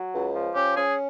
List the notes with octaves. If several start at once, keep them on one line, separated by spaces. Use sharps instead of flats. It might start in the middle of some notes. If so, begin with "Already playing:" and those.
Already playing: F#3
C#2
F3
C#4 G4
C#4 G#4